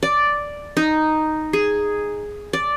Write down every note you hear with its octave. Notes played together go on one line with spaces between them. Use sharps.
D5
D#4
G#4
D5